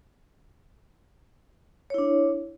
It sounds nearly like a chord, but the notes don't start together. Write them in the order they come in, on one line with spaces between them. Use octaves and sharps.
C#5 E4 D4